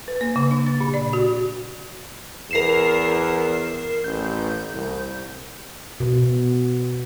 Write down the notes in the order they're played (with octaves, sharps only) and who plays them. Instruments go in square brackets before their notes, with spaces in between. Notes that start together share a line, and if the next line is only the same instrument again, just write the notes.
[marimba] B4
A#3
C#3
D4
A6
A#2
D5
F#4
[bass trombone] E2 [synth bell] A#4 C7 E7
[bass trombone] A1 [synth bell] G6
[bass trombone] C2
[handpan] B2